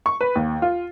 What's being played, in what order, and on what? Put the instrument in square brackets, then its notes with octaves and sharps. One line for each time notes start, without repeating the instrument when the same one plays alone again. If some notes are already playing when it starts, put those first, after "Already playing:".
[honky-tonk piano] C#6
B4
D#2
F4